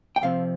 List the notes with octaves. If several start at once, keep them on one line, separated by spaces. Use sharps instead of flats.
G5
F2 C3 F3 C4 F5